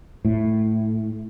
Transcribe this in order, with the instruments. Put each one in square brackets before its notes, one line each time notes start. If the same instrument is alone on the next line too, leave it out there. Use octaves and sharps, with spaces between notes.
[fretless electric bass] A2